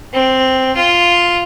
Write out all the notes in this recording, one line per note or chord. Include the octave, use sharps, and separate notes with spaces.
C4
F4